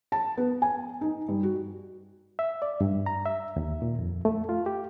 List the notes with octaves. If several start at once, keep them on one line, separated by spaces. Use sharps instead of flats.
A5
B3
G#5
D#4
G2
F#4
E5
D5
G2
A#5
E5
D#2
A#2
F2
A3
F4
G4